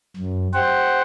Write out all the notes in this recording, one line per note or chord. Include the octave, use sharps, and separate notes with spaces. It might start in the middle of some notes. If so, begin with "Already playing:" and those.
F#2
G4 C5 F#5